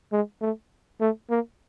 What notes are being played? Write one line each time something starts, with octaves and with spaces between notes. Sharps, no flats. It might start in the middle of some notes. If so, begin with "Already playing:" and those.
G#3
A3
A3
A#3